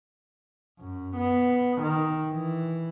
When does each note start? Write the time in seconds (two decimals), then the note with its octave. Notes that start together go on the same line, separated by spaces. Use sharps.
0.79 F#2
1.16 B3
1.82 D#3
2.30 E3